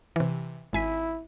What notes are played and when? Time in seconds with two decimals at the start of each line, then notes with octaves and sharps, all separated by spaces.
0.16 C3 E3
0.73 G#1 E4 G#5 B6